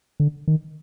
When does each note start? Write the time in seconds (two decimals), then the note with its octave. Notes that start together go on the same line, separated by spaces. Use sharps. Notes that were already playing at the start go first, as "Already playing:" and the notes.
0.20 D3
0.48 D#3